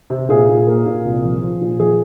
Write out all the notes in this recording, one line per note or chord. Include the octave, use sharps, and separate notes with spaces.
C3
A#2 G#4
A#2
A#3
A#2
C2
F3
F3
A#2
F3 G#4